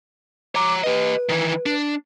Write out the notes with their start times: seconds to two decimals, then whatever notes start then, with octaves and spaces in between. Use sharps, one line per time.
0.55 C#5 A#5 D6
0.84 G4 B4 D#5
1.29 D#3 E3
1.66 D4